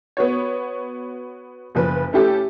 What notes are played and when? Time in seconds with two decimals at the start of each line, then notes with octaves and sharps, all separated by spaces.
0.17 B3 F#4 C#5
1.75 F#1 F3 B4
2.13 A3 C#4 E4 G4 A4